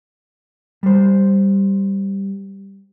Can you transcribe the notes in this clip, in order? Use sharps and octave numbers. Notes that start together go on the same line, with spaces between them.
G3 C5